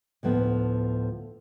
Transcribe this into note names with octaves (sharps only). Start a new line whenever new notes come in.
D2 A2 F3 B3